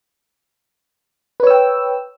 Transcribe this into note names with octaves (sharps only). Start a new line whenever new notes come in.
B4 C#5 G5 E6